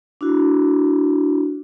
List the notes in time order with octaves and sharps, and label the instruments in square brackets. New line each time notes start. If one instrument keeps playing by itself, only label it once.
[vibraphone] D4 E4 F#4